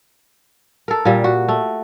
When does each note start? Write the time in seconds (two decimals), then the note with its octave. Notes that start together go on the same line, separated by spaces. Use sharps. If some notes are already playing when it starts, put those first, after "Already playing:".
0.88 A4 A#4
1.05 A#2 G3
1.24 F#4
1.49 A3